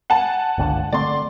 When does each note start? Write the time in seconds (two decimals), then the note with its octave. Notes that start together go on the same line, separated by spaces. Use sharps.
0.10 F#5 G#5 A5
0.58 G1 C#2 D3
0.93 D3 A3 C4 D5 C6